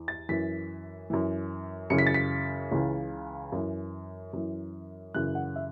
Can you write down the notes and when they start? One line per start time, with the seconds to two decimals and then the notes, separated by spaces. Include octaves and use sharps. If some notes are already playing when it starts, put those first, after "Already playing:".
Already playing: E2
0.08 A6
0.29 F#2 E3 B6
1.10 F#2 E3
1.90 F#2 C#3 E3 C#7
1.98 B6
2.07 A6
2.14 B6
2.71 C#2 C#3 E3
3.52 F#2 E3
4.33 F#2 E3
5.14 F#2 C#3 E3 F#6
5.35 F#5
5.56 E5